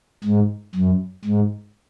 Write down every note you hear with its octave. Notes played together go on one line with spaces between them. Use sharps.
G#2
F#2
G#2